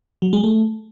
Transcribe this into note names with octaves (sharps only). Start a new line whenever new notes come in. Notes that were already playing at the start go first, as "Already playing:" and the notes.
F#3
G#3
A3